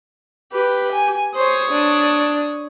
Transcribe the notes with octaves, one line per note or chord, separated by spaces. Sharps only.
G4 B4
G#5
C5 C#5 D#6
D4